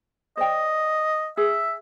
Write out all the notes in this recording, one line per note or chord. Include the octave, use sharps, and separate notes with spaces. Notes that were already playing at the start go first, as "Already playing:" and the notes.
C5 D5 D#5 G5
G#4 E5